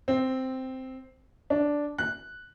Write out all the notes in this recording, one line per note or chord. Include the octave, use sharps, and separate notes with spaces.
C4
D4
F#6